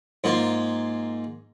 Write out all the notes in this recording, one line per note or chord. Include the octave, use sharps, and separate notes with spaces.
G#2 A#3 F4